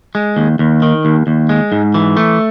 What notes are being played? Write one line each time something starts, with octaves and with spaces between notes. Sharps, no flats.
G#3
D#2
D#2
D#3
D#2
D#2
G#3
G#2
E3
A3